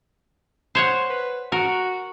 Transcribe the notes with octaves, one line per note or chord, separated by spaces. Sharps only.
C5 C#5 F#5
B4
F#4 A#4